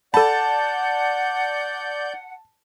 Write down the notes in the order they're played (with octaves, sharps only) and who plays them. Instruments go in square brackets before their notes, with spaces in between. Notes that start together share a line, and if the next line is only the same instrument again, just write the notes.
[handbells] A4 B5 [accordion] D5 G6 [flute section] F#5 [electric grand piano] A5